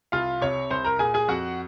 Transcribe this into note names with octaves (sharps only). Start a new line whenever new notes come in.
C2 F4 F5
C3 C#5 C#6
C2 C5 C6
A#4 A#5
A#2 G#4 G#5
G#4 G#5
F2 F#4 F#5